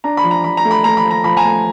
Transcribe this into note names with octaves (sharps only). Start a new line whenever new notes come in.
D4 A#5
B5
F3
A#5
F3 B5
A#5
A3
B5
A3 A#5
B5
F3
A#5
F3 B5
G#5 A#5
A3